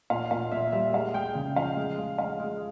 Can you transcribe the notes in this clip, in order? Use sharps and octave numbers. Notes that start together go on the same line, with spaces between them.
A#2 F5
A#2 F5
A#2 E5
G3 E5
G#3 F5
G#3 G5
C#3 G5
F3 F5
G#3
G#3
G#3 F5
G#3